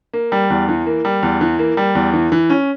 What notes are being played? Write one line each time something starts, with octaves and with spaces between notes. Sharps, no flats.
A#3
G3
E2
E3
A#3
G3
E2
E3
A#3
G3
E2
E3
E3
C#4